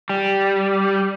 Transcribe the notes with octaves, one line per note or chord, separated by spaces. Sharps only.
G3